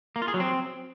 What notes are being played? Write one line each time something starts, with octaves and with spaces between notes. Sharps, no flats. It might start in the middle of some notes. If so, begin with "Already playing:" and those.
A#3
F4
G#4
F#3
C4